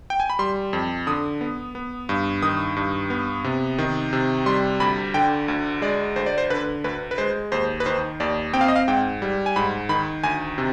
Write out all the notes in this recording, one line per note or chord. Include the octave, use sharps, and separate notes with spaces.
G5
G#5
B5
G3 C6
F2
D3 D#6
B3
B3
G2
D#3 D#6
G2
B3
C3
D#3
C3
G3 C6
D2 B5
D3 G5
D2
G#3 D5
D2 C5
D5
C5
D3 B4
D2 B4
B4
G#3 C5
D#2 C5
B4
D#3 C5
D#2 D5
C4 G5
F5
D#5
F5
G#2 G5
G3
G#5
G#2 B5
D#3 B5
D2 G#5
C3